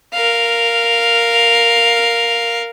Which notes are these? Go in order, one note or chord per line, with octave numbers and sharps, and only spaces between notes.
A#4 F5